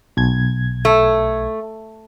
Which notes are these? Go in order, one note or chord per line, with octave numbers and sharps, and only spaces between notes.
B1 G#6
A3